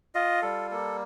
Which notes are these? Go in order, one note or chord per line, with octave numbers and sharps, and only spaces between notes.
F4 D#5
G3 A4
A#3 A4